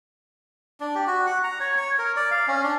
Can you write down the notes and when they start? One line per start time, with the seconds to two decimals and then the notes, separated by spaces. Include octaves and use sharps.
0.80 D4
0.95 G4
1.07 F#4
1.27 F#5
1.44 A#5
1.60 C#5
1.77 C#5
1.99 A#4
2.16 D5
2.31 F5
2.48 C#4
2.64 D4